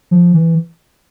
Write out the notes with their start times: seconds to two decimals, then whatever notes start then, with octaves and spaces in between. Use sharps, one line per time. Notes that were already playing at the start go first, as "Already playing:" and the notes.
0.11 F3
0.34 E3